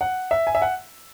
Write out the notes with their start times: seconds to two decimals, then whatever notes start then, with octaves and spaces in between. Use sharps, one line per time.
0.01 F#5
0.31 E5
0.47 G#5
0.55 E5
0.62 F#5